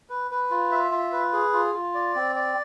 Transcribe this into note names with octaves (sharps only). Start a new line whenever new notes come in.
B4
B4
F4
E5
F4
B4
G#4
F4
F4
D5
C4
D5